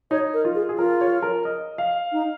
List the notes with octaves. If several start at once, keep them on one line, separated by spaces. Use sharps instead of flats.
D#4 C#5
A#4
F4
G#4
G#4
F4 A#4
C#5
A#4
D#5
F5
D#4